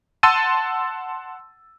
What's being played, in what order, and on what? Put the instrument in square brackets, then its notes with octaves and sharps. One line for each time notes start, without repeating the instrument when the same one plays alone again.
[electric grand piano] F#5 A5 C6 E6 A6 D#7